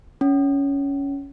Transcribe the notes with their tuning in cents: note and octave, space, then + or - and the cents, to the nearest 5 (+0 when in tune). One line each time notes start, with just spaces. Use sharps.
C#4 +10